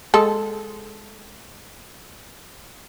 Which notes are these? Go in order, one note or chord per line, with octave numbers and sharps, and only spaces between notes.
G#3 A4